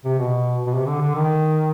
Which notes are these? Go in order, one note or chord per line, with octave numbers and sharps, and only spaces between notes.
C3
B2
B2
C3
D3
D3
D#3